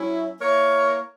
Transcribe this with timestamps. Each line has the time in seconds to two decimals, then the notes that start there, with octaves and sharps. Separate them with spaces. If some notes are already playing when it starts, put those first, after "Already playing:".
Already playing: F#3 C#4 E4
0.41 A#3 E4 A#4 C#5